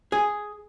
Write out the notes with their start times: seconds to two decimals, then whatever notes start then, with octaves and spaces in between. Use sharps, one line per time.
0.12 G#4